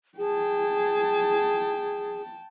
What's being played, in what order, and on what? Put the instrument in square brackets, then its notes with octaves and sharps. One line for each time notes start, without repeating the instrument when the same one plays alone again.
[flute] G#4 [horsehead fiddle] G5 A5